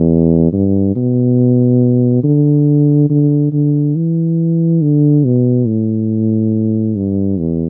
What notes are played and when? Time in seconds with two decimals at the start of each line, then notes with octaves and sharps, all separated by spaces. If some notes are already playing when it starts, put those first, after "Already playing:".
Already playing: E2
0.52 G2
0.95 B2
2.23 D3
3.09 D3
3.52 D3
3.95 E3
4.81 D3
5.24 B2
5.67 A2
6.96 G2
7.38 E2